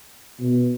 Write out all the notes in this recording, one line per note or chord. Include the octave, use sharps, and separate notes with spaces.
B2